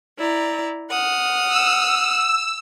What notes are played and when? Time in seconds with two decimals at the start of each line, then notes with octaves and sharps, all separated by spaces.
0.18 E4 D5 A#5
0.89 F#5 D#6 F6
1.48 E6